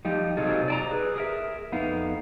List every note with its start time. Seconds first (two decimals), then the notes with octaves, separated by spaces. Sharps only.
0.05 F3 G3 D#4
0.37 C3 F#3 D#4 F4 G#4 A4
0.68 D5 A5 A#5
0.91 G#4 B4
1.16 G#4 A#4 E5
1.72 F2 B3 D#4 F5